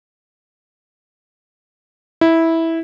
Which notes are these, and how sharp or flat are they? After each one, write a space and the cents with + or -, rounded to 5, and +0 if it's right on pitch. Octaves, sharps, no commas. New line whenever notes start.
E4 -10